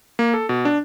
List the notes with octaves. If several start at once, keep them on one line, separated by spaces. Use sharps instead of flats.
A#3
A4
B2
D4